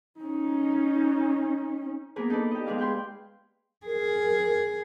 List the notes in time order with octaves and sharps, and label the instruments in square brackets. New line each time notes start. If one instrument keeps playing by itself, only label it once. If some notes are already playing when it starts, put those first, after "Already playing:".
[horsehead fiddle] C#4 D#4
[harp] A#3 B3 G#4 A#4 B4
D4 D#4 A4 B4 D5
G4 D#5
G#3 B3 G#4 D5 F5
G#4 B4 G5 C6
[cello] G#4 [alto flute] A#4